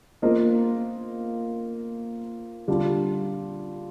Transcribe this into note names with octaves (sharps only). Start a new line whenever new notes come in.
A#3 F4 C5 D#5
D3 G3 D4 F4